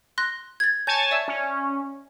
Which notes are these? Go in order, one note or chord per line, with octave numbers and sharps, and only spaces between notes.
C6 F#6 A#6
G#6 A6
C#5 G#5 A5 G6
D5 E5 E6
C#4